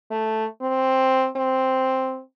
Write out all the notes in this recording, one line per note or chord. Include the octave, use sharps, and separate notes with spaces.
A3
C4
C4